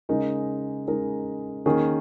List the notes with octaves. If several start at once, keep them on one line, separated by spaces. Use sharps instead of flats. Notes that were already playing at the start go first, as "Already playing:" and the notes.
C#3 G#3 D#4 A#4
C#3 G#3 D#4 A#4
D#3 A#3 C#4 G#4